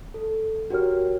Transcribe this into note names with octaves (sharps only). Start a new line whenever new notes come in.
A4
F#4 G4 A#4 C#5 F6